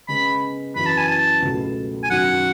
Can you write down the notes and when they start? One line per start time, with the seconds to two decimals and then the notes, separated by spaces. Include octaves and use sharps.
0.08 C#3 G#3 B3 B5
0.76 F#2 E3 B3 E4 B5
0.86 A5
0.98 G#5
1.09 A5
1.42 C#2 B2 F#3 A3
2.03 G#5
2.10 F#2 D#3 F#3 F#5